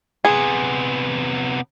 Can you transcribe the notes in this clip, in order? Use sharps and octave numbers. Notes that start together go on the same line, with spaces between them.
C3 B3 G#4